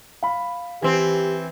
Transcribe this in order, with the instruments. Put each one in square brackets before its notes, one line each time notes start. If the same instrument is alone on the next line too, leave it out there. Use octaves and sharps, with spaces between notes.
[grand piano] F5 B5
[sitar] E3 C4 [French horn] G4 [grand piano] G#5